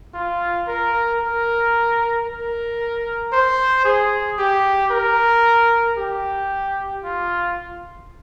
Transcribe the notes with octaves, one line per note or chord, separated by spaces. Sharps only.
F4
A#4
A#4
A#4
C5
G#4
G4
A#4
G4
F4